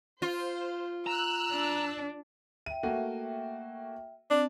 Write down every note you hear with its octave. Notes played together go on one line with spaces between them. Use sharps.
F4 C5
A#5 E6 F#6
D4
E5 G5 D#7
A3 A#3 F#4
C4 D4